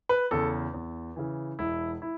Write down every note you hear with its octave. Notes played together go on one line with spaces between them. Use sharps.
B4
E2 C#3 A4
E2
C#3 E3
E1 E4
E4